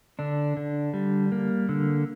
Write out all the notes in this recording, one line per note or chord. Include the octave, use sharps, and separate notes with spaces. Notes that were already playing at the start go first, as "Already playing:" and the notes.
D3 D4
D3
G3
A#3
D3